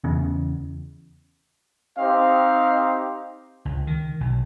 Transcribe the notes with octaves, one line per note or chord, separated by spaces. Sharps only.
E2 C#3
C4 D#4 G4 D#5 F5
C#2
D#3
B1